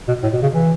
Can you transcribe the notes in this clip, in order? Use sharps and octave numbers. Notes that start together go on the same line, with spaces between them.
B2
A2
B2
C#3
E3